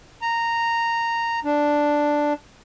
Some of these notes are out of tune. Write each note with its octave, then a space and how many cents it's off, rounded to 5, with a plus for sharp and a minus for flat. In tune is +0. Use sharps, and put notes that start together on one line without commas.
A#5 -10
D4 +0